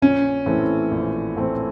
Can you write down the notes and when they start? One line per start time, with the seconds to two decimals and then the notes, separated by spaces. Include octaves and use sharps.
0.02 A#1 C#4
0.46 A2 E3 A3 C4
0.91 A#1
1.35 A2 E3 A3 C4